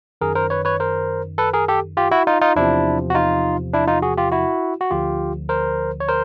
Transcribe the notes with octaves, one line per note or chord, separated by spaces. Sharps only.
F#2 D#3 G#4 A#4
A#4 C5
B4 C#5
B4 C#5
A#4 C5
A4 B4
G#4 A#4
G4 A4
F4 G4
E4 F#4
D#4 F4
D#4 F4
E2 C3 F3 D4 E4
F#4
D#4 F4
D4 E4
D#4 F4
F#4 G#4
F4 G4
E4 F#4
F#4
D2 D3 F3 F4 G4
A#4 C5
C#5
A#4 C5